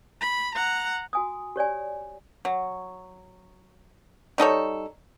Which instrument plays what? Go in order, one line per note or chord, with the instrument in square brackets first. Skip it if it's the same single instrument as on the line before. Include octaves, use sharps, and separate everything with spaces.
[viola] B5
F#5 A#5
[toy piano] F#4 G#5 D#6
G4 C#5 D5 G#5
[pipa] F#3
G3 D#4 A4 C#5